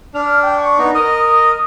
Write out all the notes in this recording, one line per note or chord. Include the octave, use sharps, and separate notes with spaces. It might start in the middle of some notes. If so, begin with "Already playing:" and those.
D4 F6
G5
C#6
B3 D#4
A#4 D#5 D#6